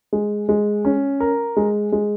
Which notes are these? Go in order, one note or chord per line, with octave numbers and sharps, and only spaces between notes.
G#3
G#3
C#4
A#4
G#3
G#3